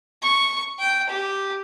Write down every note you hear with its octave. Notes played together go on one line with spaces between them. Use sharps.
C#6
G5
G4